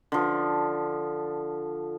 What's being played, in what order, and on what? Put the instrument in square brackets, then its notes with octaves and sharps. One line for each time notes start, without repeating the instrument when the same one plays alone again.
[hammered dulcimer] D3 F3